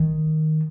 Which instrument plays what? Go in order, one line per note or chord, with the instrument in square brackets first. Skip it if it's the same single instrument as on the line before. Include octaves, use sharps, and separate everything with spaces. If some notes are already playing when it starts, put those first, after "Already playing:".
Already playing: [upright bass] D#3